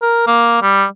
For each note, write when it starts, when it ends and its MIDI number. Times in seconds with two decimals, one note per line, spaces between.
0.02 0.26 70
0.27 0.60 58
0.62 0.85 55